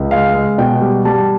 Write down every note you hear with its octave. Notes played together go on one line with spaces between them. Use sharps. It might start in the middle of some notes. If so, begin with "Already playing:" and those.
Already playing: C#2
G#3 F5
G#3
B2 G5
G3
G3 A5